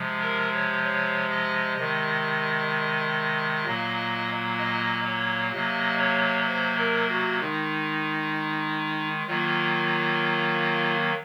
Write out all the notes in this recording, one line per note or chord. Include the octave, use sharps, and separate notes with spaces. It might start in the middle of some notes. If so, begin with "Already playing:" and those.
Already playing: C3 F3 G#3
A#4
C#5
C#5
D#5
C3 D#3 G#3 D#5
A#2 F#3 A#3
D#5
C#5
C3 F#3 A#3 D#5
C#5
C5
A#4
F#4
D#3 G#3 D#4
D#3 F#3 A#3 F4